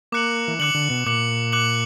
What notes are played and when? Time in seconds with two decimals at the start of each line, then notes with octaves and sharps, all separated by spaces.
0.12 A#3 D6 F#6 C#7 F#7
0.48 E3
0.59 D3 D6 F#6 C#7 F#7
0.74 D3
0.90 B2
1.06 A#2 D6 F#6 C#7 F#7
1.52 D6 F#6 C#7 F#7